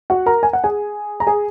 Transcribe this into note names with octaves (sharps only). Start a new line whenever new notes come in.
F#4 F#5
A#4 A#5
G#5
F#5
G#4 G#5
A#5
G#4 G#5